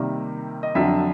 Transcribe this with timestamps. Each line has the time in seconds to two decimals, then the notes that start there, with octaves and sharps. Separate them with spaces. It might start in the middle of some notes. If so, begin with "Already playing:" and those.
Already playing: C3 D#3 G3 A#3
0.63 D#5
0.75 F2 D3 F#3 E5